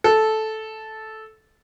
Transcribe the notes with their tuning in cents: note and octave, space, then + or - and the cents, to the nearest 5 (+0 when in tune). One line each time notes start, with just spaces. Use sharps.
A4 -10